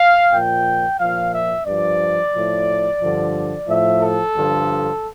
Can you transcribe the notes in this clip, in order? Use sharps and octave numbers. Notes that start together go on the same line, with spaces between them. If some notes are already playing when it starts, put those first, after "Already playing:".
Already playing: F5
A#2 F3 G5
A#2 F3 F5
E5
G2 F3 D5
A2 F3
G2 D3 F3
A2 F3 E5
A4
G2 D3 F3